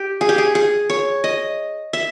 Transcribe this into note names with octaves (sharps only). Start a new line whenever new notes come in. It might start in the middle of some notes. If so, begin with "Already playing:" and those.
Already playing: G4
G#4
G4
G#4
G#4
C#5
D#5
E5